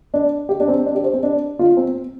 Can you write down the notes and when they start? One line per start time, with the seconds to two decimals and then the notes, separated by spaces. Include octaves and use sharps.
0.14 D4
0.49 G4
0.60 D4
0.68 C4
0.86 D4
0.95 G4
1.04 C5
1.13 C4
1.23 D4
1.59 F4
1.77 C4
1.95 C4